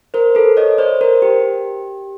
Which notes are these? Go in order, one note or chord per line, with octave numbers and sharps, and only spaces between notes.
A#4 C5
A4 B4
C#5 D#5
C5 D5
A#4 C5
G4